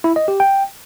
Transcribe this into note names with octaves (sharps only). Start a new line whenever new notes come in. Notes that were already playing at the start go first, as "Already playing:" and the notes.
E4
D#5
G4
G5